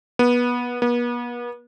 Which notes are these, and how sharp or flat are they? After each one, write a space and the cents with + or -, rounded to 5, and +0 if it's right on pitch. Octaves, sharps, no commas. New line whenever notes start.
B3 -20
B3 -40